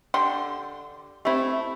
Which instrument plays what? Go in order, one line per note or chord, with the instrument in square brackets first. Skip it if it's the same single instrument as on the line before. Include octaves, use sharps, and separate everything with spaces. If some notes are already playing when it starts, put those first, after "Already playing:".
[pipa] D3 G4 C6
[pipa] A3 E4 [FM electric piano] C4 G4